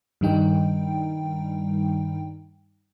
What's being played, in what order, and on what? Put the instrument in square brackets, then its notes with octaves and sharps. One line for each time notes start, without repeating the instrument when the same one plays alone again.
[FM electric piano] G2 D#3 G3 D#4 G5